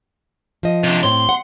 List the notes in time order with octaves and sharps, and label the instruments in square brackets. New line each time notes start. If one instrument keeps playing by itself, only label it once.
[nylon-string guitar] F3 D#5
[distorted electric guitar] C3 D4
[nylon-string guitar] A2 C4 C#5 [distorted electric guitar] C6
[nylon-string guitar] F#5